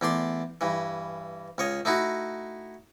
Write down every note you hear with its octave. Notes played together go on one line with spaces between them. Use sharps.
E2 A3 D5 C6
G2 E3
C#2 C#5 D#5
A3 D#4 E4 F#4